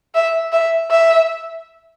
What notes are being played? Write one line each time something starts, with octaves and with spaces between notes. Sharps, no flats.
E5
E5
E5